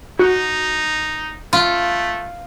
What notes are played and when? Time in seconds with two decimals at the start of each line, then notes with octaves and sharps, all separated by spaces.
0.19 D#4 F#4
1.53 A3 F4